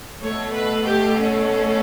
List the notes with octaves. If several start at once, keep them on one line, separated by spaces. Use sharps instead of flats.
B2 A3 C#5
B4
G4
C#4